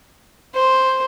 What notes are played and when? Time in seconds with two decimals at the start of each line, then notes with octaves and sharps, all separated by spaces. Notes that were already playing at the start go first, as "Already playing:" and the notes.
0.55 C5